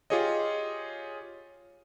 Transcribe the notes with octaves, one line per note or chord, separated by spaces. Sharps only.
F4 G4 G#4 C#5 D#5